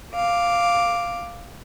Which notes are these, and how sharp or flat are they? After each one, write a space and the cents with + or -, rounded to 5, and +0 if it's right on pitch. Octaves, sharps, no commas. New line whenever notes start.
F5 +0 D6 +0